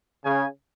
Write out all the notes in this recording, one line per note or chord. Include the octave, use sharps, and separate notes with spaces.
C#3 G#5